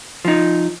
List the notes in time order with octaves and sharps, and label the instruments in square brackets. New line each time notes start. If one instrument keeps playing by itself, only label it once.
[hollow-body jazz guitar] F3 D#4